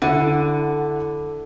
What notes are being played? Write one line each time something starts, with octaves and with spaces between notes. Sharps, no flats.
D3 E4 F#5 D#7